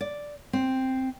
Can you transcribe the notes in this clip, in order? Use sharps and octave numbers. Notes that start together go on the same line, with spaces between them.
D5
C4